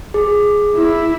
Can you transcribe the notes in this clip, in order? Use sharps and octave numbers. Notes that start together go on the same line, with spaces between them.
G#4
E4